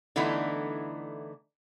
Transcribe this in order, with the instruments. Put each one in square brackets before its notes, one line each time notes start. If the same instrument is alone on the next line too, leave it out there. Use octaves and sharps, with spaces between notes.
[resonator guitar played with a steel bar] D3 E3 A3 B3 D#4 E4